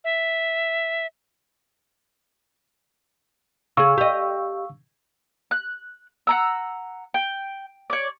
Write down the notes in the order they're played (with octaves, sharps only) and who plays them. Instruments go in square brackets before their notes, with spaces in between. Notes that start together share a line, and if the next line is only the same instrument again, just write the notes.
[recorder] E5
[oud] C#3 G#4 [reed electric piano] F5 C#6 E6
[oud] G4 D#5
[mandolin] F#6
F#5 A#5 E6
G5
C#5 D5